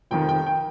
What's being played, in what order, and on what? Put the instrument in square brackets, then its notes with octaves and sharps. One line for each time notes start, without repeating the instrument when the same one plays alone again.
[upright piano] F1 F2 D#3 G5
G5
G5